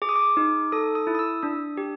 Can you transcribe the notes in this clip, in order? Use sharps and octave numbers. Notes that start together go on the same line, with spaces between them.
G#4 D6
D#6
D6
D#4
A4 D#6
D#6
E4
D#6
E6
D4 D#6
G4